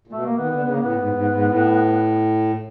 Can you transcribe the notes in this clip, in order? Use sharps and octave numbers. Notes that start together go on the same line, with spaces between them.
A#2
B2 A3
A#3
D#3 B3
D3 B3
C#3 B3
A#3
A2 B3
G#2
G2
G#2
G#2
A2